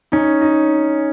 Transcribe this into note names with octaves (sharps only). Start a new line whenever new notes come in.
C#4 D#4
D#4